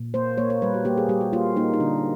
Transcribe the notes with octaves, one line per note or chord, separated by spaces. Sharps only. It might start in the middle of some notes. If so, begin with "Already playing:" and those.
Already playing: A#2
A#3 C5
A#3 C#5
C#5
G3 B4
F#4
A#3 G4
G#4
G3 G4
F#4
A#3 F4
A#3 D#4
D#4
D3 D4